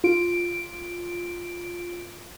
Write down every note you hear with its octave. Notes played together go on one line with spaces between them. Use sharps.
F4 D7